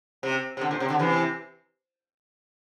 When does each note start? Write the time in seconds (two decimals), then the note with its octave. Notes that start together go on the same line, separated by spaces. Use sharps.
0.23 C3
0.57 C3
0.61 D3
0.71 A#2
0.80 C3
0.90 D3
0.99 C3 E3